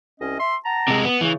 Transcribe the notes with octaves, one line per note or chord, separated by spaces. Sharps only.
C2 C#4 D#5
E5 C6
F#5 A5 A#5
C3 G#3
B3
C#3 E3 A3